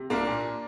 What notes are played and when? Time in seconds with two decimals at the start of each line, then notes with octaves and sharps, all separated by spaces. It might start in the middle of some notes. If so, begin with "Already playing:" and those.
Already playing: C3
0.10 C2 A#3 D4
0.27 A#2